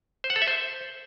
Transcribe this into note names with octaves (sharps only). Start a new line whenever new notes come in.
C5
F#5
A4
E5
C5